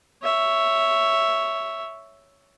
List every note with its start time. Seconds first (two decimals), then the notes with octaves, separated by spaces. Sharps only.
0.23 C#5 E5